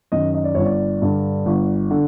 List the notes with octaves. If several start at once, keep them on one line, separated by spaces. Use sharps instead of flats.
F#2 D#3 D#5
D#5
D5
G1 C#5
D5
G2 D3
G1
D3